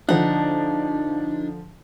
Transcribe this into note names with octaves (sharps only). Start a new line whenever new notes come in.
D3 F3 D4 D#4 F#5